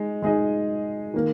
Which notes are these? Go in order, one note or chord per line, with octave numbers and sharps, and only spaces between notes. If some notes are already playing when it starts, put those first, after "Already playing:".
Already playing: G#3 D#4
G#3 D#4 G#4 D#5
D#3 A#3